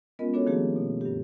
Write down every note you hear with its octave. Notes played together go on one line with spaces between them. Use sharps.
G#3 B3 C#4 F4 A#4 D#5
B3 D4 F#4 A4 C#5
D#3 F3 A3 A#3 G4 G#4
B2
G2 G4